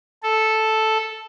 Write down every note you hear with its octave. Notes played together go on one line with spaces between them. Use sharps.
A4